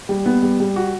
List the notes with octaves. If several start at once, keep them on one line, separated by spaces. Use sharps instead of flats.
G3
B3
G3
G3
F#4